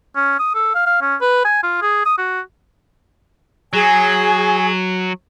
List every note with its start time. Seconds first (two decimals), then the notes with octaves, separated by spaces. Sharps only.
0.16 C#4
0.39 D#6
0.55 A4
0.74 F5
0.86 F5
1.02 C#4
1.21 B4
1.45 G#5
1.63 F4
1.82 G#4
2.05 D#6
2.18 F#4
3.73 F#3 G#4 G#5